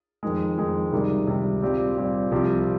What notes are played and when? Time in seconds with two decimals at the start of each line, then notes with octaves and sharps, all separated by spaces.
0.23 F2 D#3 G#3
0.58 F2 D#3 G#3
0.92 C#2 C3 D#3 G3
1.27 C#2 C3 D#3 G3
1.62 A#2 G3 C4 G4
1.97 A#2 G3 C4 G4
2.31 C2 C3 F3 C4 G4